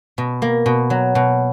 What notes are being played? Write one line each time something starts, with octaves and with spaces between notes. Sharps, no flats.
B2
A#3
B2
F#3
B2